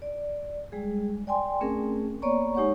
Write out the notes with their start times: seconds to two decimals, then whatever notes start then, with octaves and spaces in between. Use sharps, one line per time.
0.02 D5
0.72 G3 G#3 G#4
1.27 D5 G5 G#5 C6
1.61 A3 C4 C#4 G#4 A#4
2.22 A#3 B3 C#5 D5 A#5 C#6
2.55 G#3 D#4 G4 C#5 F#5 C#6